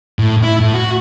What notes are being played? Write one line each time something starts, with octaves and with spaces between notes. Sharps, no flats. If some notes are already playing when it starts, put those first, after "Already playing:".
A2
E4
A2
F#4